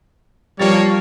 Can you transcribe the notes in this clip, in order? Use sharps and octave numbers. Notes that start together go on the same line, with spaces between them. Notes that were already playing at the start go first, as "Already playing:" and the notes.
F3 G3 A#3 C#5 A6